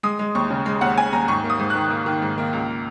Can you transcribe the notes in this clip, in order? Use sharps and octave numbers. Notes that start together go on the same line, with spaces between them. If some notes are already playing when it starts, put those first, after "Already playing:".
G#3 D#6
G#3
D#2 C#6
C#3
G#3
D#2 F#5
D#2 G#5
D#2 A#5
G#2 C#6
A#3
D#6
G#2
D#3 F#6
A#3
D#3
G#2
A#3
C#2